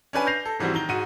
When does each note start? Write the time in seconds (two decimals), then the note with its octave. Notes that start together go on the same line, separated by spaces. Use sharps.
0.13 C#4 D4 B4 G#5
0.27 G6 A#6 C7 F7
0.45 A4
0.59 G#2 E3 G3 C4 F#4
0.74 D#3 A#5 G7
0.89 G#2 F#4 D#7